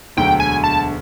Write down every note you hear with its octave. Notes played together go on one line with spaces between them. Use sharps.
E1 D2 D3 F#3 G5
G#5
A5